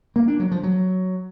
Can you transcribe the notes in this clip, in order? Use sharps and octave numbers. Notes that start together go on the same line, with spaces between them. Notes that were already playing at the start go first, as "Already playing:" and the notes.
A#3
D4
F#3
F3
F#3